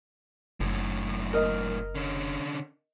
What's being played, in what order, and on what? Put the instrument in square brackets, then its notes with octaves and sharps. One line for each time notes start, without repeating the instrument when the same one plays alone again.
[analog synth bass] F#1 [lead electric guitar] F#2 A2
[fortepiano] A#4 D#5
[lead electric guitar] D3 C#4